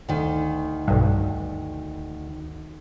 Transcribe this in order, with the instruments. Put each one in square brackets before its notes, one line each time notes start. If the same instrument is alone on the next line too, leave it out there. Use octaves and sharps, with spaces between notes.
[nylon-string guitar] D2 D#3
[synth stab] B1 G2